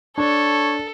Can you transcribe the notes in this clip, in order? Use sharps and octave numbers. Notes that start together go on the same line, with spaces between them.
D4 A4 C#5